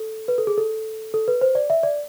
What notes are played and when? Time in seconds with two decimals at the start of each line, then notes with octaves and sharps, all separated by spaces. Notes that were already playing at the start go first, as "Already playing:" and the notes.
Already playing: A4
0.28 B4
0.38 A4
0.47 G#4
0.58 A4
1.14 A4
1.28 B4
1.41 C5
1.55 D5
1.70 E5
1.83 D5